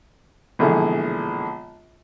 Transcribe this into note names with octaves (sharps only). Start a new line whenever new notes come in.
A#1 B2 D3 E3 G#3